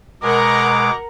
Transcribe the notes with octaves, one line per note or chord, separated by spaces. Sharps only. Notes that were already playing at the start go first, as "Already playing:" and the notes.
B2 G#3 A#4 F#5 A#5 D6